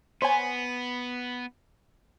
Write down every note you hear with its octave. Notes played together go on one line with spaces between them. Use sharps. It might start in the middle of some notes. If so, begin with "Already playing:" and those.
B3 C5 C#5 G#5